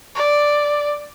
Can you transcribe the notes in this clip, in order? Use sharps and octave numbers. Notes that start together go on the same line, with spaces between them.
D5